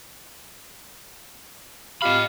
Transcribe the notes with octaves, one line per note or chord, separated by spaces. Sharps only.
F4 G4 D#5 F5 B5